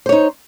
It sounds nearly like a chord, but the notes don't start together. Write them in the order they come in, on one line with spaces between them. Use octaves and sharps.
C5 C#5 D#4